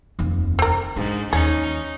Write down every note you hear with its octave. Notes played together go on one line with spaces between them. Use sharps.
F1 D#2
C4 A#4
G#2 D4
D#2 C#4 D#4 G#4